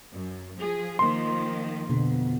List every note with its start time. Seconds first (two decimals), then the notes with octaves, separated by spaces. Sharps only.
0.11 F#2
0.58 F3 G#4
0.99 D#3 F3 A#3 C6
1.90 F2 B2 D3 B3